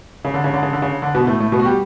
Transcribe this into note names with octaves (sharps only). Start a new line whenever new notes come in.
C#3
D3
C#3
D3
C#3
D3
C#3
D3
B2 B3
A2 A3
A2 A3
B2 B3
F#4
G3 G4